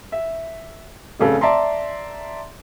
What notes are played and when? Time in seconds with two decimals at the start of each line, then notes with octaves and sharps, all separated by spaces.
0.12 E5
1.20 F1 C#3 A4
1.41 D5 E5 A5 A#5 C6